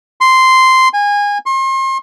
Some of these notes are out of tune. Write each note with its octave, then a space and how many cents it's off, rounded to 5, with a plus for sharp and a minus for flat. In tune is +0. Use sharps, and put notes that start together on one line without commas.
C6 -5
G#5 -25
C6 +40